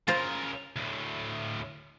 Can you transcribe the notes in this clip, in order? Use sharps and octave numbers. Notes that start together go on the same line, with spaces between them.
C#3 F4 A#4 C5 A#5
D2 A2